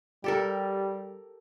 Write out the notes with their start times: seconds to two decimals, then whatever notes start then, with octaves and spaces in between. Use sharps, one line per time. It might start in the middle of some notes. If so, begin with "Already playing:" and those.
0.24 G3 G4 A4 A#4